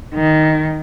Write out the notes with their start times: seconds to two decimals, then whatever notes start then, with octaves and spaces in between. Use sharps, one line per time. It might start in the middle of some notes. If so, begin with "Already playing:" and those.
0.15 D#3